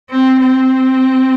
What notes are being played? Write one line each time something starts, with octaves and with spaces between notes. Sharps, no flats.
C4
C4